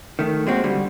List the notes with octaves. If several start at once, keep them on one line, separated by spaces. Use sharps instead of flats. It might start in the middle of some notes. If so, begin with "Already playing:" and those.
D#3 A3
A#2 G#3 C4 F#4
D3 G3